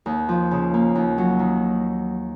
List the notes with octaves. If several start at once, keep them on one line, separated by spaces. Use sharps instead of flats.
D#2
F3
C#3
A#3
D#2
F#3
D#3